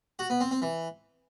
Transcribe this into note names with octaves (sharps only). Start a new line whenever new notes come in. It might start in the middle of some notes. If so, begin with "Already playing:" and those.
F#4
B3
C4
C4
E3